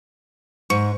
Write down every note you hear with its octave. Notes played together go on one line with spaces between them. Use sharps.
G#2 C#6 C#7